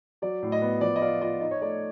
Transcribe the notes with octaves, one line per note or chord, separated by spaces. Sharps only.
F#3 D5
A2
D#5
B3
F3 D5
D#5
F4 D5
F4 D#5
D#4 D#5
C#5
A3 D5